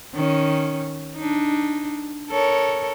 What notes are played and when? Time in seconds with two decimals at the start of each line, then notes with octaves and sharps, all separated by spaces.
0.14 D#3 C#4
1.16 D4 D#4
2.29 A4 A#4 C#5